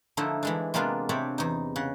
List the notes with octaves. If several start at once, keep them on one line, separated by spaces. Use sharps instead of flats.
D3 F3 A3 D#4 E4
E3 G#3 D4
C3 G#3 A#3 B3 D4 F4
C3 C4 D4 C#5 D5 B5
E2 D#4
C#3 F#5